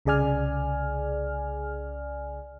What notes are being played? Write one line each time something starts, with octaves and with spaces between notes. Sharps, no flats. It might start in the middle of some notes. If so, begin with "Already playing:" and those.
C2 C#3 G#4 D5 G#5 F6